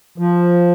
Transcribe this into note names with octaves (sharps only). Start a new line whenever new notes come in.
F3